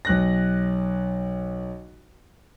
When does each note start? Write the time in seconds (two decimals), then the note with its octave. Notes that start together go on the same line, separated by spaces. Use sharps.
0.05 B1 F#6 A#6